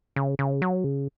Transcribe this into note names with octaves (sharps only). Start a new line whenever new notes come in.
C#3
C#3
F#3
C#3